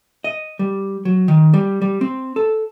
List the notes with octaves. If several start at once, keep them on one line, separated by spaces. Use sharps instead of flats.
D#5
G3
F#3
D#3
G3
G3
C4
A4